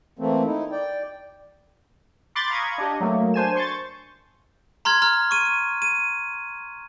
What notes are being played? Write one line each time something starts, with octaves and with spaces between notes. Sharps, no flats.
E3 A3 A#3 C4
D#4 E4
D5 G5
B5 C6 D6 F#6 G6 A6
F5 A#5 B5 C#6 D#6 G#6
D4 G4 D#5
F#3 A3 A#3
D4 C5 G#5 E7
C6 C#6 G6 A6
A#5 C6 F6 G#6
A#5 F6
C#6 D#7
D#7